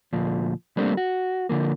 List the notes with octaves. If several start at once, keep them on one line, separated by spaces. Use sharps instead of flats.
D2 A#2 F3
G3 A3 A#3 C4 D4
F#4
D3 F3 A#3